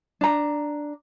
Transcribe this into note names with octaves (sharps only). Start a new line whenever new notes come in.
D4 A#5